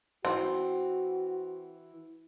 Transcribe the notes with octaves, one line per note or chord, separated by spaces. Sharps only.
E3 C4 F#4